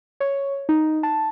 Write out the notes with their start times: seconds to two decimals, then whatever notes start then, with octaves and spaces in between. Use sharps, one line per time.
0.20 C#5
0.69 D#4
1.03 A5